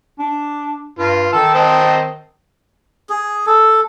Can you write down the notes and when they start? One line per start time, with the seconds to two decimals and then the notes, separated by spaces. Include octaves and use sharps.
0.19 D4
0.99 G2 F4
1.33 D#3 A5 E6
1.55 C4 D#5 A5
3.10 G#4
3.46 A4